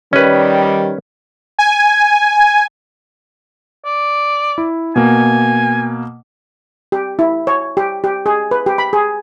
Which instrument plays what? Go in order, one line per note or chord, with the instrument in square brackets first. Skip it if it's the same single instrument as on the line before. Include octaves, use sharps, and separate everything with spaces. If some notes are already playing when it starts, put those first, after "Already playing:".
[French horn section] D#3 G3 [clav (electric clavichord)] C#4 B4
[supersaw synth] G#5
[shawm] D5
[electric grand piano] E4
[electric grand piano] B2 A#3 [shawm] G#5
[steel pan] G4
E4
C#5
G4
G4
G#4
B4
G4
B5
G#4